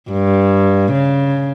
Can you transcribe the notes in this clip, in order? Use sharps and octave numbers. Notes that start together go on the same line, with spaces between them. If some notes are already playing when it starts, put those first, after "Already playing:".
G2
C#3